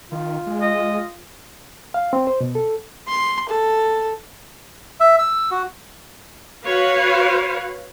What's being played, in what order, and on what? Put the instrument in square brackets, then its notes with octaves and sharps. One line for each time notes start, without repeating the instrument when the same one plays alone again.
[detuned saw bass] D#3 [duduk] F4
[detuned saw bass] G#3
[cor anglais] D#5
[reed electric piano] F5
C4
C5
B2
A4
[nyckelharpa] C6
A4
[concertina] E5
E6
F#4
[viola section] F#4 B4 C#5 F5